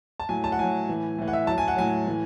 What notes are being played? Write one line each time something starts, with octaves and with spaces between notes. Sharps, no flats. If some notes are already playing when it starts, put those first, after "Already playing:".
A5
A2 F#3 G#5
A5
F#5
A2 F#3 G#5
A2 E3
A2 E3
F#5
E5
A2 F#3 A5
G#5
F#5
A2 F#3 G#5
A2 E3